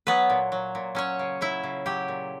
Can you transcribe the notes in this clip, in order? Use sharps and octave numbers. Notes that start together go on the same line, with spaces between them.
F#3 B3 B4
A#2
F#3
A#2
F#3 C#4 C#5
C#3
F#3 E4 E5
C#3
F#3 G4 G5
A#2